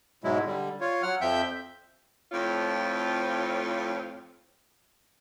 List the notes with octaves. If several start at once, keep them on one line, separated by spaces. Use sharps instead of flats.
G#2 B2 F#3 G#3 E4
D3 G3
F4 C#5
F#3 F#5 F6
F2 F3 E5 G5 G6
F2 A2 C4 F4 C#5